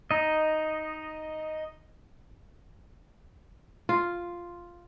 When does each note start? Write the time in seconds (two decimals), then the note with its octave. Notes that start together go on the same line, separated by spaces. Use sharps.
0.11 D#4 D#5
3.89 F4